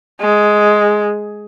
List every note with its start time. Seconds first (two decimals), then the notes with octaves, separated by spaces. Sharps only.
0.21 G#3